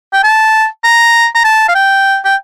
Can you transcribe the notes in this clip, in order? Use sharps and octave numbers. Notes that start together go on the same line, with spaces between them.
G5
A5
A#5
A#5
A5
F5
G5
G5